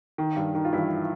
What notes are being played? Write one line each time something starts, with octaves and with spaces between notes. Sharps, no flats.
D#3
G2
D#3
F4
G2 E3 E4